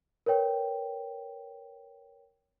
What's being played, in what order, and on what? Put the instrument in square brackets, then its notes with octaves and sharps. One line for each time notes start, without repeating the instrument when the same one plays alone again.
[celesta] A#4 B4 C#5 G5